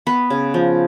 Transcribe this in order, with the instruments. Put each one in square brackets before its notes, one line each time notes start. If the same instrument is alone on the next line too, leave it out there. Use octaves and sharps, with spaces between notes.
[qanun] B3 B4
C#3
F3